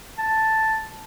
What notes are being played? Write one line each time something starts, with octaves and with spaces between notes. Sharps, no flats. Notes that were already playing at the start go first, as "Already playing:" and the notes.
A5